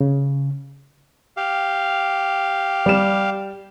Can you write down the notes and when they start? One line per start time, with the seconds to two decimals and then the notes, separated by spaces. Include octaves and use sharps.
0.01 C#3
1.37 G4 F5
2.86 G3 E7